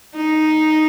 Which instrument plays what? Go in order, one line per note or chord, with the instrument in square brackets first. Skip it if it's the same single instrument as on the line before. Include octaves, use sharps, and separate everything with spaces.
[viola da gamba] D#4